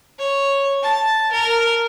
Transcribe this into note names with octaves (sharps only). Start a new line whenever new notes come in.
C#5
A5
A#4